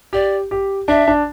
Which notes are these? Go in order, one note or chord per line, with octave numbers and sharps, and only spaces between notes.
G4 D5
G4
D4 E5
D4